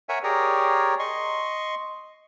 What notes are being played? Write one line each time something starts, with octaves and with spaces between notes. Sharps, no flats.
A#4 C#5 E5 F#5 G#5
G4 G#4 A#4 C#5 D5 A#5
D#5 C6 C#6